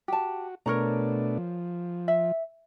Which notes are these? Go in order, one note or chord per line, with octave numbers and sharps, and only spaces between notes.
F#4 G4 A5
B2 A3 D4 A#4 C#5 A#5
F3
E5